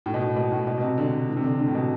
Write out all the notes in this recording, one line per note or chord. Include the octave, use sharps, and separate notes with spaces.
A2
B2
A2
B2
A2
B2
B2
C3
D3
E3
C3
D3
D3
A2
B2